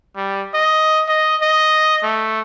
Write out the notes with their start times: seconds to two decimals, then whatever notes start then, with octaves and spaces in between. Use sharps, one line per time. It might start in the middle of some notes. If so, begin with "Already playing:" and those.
0.17 G3
0.54 D#5
1.08 D#5
1.42 D#5
2.03 A3